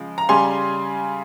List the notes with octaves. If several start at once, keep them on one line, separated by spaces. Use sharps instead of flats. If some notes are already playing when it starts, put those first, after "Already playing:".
Already playing: C#3 F3 G#3
A#5
C#3 G3 G#5 C6